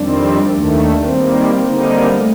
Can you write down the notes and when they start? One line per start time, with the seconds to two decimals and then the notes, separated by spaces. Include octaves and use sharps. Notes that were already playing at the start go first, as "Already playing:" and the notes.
Already playing: F2 D#3 G3 C4 D4
0.49 D#2 D#3 A3
1.06 D#3 G3 A#3 C4
1.62 D3 G3 A#3 D#4
2.19 A3